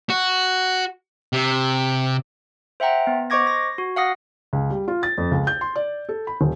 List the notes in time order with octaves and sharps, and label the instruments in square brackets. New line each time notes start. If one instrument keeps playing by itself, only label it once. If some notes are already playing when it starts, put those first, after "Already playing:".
[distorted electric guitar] F#4
C3
[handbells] C5 E5 F#5 G5 A#5
B3
C5 D#5 C#6 D6 G#6 A#6
A#6
F#4
F5 F#5 D#6 A#6
[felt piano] C#2
G3
F4
A6
F2
C#2
G6
C6
D5
A4
B5
D#1